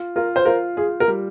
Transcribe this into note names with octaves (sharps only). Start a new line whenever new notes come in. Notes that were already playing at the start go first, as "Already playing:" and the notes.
Already playing: F4
F4 A#4
C5
F4 A#4
F4 G#4
A#4
G3